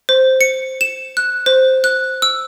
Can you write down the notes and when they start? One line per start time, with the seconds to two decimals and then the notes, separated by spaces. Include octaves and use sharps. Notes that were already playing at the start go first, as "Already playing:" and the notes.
0.09 C5
0.41 C#7
0.81 E7
1.17 F#6
1.46 C5
1.84 F#6
2.22 E6